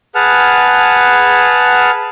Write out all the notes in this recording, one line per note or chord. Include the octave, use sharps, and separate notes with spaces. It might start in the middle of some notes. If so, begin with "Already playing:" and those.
G#4 B4 F#5 A5 F6